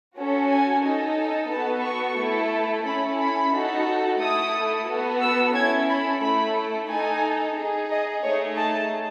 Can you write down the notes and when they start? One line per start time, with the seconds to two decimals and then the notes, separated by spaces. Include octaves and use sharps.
0.16 C#4 F#4 A4
0.50 G#5
0.84 D#4 A4
1.18 G#5
1.51 B3 F#4 A4 A5
1.84 C#6
2.19 A3 E4 A4
2.85 C#4 E4 A4 B5
3.19 B5
3.52 D#4 F#4 A4
4.20 A3 E4 A4 D#6
4.87 B3 F#4 A4
5.21 E6
5.55 C#4 E4 A4 G#6
5.89 B5
6.21 A3 E4 A4 B5
6.89 D#4 A4 G#5
7.55 D#4 G#4
7.90 D#5
8.23 A3 D#4 G#4 C#5
8.57 A5